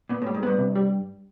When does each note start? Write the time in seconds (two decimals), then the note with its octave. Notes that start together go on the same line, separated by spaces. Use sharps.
0.09 A#2 B3
0.22 A2 G3
0.35 G#2
0.43 G2 B3
0.59 C3
0.75 G3